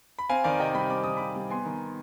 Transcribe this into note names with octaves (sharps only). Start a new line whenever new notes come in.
B5
C4 F5 G#5
D#3 D5 F5
C3 D#5 G5
G3 G5 B5
C4 D6
D#3 D#6
C3 B5 D6
G3
B3 G#5 C6
D#3